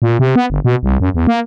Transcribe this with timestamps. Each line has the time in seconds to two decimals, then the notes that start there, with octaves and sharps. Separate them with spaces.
0.02 A#2
0.19 C3
0.36 B3
0.50 G1
0.65 B2
0.83 C2
1.00 F#2
1.14 E2
1.27 A#3